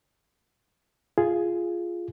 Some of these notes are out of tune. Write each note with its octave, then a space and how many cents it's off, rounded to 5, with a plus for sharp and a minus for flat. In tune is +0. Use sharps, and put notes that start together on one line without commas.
F4 -5 G#4 +0